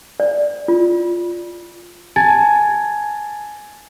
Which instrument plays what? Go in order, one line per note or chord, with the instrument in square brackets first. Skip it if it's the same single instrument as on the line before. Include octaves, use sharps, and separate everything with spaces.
[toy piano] D5
F4
[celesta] G#5 A5 G#6 A6